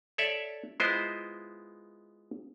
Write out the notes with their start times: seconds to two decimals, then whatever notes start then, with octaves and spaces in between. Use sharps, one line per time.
0.18 A4 C#5 D5 E5
0.80 G#3 B3 E4 F4 C5 D#5